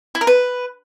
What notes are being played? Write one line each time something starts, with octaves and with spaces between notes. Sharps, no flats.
E4
A#4
B4